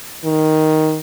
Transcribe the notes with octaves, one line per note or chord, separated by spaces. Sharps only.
D#3